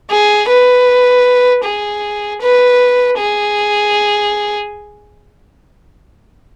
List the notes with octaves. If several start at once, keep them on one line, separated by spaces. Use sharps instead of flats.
G#4
B4
G#4
B4
G#4